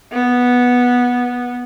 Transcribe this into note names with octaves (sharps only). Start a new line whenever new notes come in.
B3